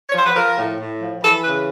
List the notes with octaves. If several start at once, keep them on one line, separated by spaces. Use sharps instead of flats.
C#5
F3 C5
B4
F3 A#4
A2
A2
F3
E3 A4
C#3 B4